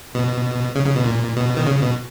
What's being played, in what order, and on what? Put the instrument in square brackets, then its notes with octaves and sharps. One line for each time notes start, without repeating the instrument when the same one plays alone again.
[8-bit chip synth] B2
C#3
C#3
B2
A#2
B2
D#3
C#3
B2